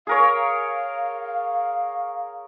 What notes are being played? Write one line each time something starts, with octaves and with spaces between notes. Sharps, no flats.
G#4 A#4 C#5 F5